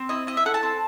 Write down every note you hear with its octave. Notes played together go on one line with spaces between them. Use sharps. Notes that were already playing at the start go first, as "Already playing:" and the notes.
Already playing: C4
E4 D#5
E4 D#5
E5
A4 F#5
A5
C4